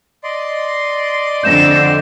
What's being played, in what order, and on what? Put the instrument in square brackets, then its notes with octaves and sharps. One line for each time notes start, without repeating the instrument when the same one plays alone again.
[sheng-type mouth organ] D5 D#5 C6
[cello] F2 D3 [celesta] G6 E7